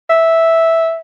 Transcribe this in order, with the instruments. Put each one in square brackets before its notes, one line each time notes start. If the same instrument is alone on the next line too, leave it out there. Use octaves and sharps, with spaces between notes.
[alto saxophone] E5